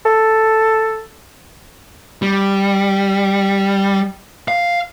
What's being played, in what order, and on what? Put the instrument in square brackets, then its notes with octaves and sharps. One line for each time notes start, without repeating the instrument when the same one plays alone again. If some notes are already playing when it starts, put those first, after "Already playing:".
[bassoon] A4
[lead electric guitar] G3
F5